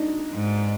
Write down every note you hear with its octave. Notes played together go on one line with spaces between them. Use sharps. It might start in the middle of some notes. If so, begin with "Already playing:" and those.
Already playing: D4 D#4
G#2